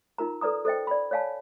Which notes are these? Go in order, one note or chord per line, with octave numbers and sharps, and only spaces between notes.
D#4 F4 A#4 A#5
A4 B4 D5 A#5 D#6
A4 C5 D#5 G5
D5 B5
C#5 D5 F5 G#5 A5